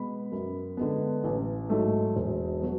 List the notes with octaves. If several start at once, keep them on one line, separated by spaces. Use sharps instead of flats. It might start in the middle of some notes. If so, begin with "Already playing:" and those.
Already playing: B2 G#3 B3 B5
F#2
D3 G#3 B3
A1
G#2 F#3 A3
E1
F#3 B3